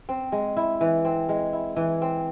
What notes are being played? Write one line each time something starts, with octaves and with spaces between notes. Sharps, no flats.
C4
G#3
E4
E3
C4
G#3
E4
E3
C4